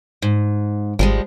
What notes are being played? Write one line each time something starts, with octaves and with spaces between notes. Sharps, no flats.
G#2
G#1 F3 G3 G#3